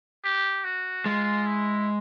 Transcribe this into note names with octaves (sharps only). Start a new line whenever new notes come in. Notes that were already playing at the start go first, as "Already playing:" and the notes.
G4
F#4
G#3 F4
E4